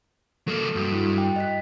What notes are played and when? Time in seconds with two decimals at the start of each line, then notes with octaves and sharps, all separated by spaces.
0.48 F#3 A#3 A4
0.76 G2 F#4 D#6
0.93 E4 F#4
1.18 G5
1.36 D#5 F#6 B6